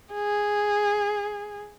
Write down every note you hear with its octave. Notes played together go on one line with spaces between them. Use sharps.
G#4